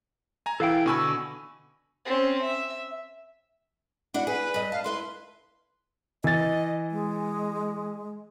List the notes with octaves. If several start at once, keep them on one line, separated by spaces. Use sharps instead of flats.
G#5 A#5
E3 E4 A4 F5 G5
B2 D3 G#5 B5 C#6 E6
C4 C#4
E5
D4 E4 F#4 F#5
G#4 B4
G2 D#5
F5 A5
E4 B4 E5 C6
E3 D#5 A6
G#3